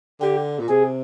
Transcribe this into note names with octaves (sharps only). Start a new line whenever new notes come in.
D3 G4
A#2
C3 G#4